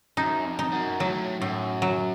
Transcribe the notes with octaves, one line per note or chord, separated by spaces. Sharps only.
F#2 D#4
F2
D#4
F#2
A2 F#3
F#2 A2
F#3